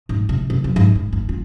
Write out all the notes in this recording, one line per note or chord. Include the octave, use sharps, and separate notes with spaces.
G#2
C3
C3
F#3
G#2
G#3
G#1
F4